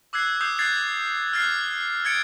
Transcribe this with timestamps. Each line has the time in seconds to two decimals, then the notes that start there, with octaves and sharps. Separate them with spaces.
0.13 D6 E6 F#6 G#6 C7
0.41 D#6 E6 G6 C7
0.59 F#6 G#6 A6 C7
1.33 F6 F#6 A6 C7
2.05 F6 G#6 A6 C#7 D7